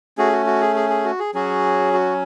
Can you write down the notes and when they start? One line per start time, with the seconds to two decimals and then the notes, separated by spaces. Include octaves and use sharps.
0.18 A3 C#4 F#4 G#4
0.32 F#4
0.46 F#4
0.61 G#4
0.76 G#4
0.90 G#4
1.04 F#4
1.19 G#4
1.34 F#3 C#4 F#4 G#4
1.93 F#4